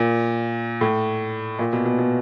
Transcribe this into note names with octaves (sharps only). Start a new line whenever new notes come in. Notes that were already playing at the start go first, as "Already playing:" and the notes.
Already playing: A#2
A2
A#2
B2
B2
B2